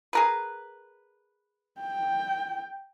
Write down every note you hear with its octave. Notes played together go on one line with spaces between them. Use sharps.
G#4 A#4 B4
G5